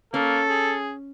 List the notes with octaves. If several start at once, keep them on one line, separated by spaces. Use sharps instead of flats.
A#3 C#4 A4
G#4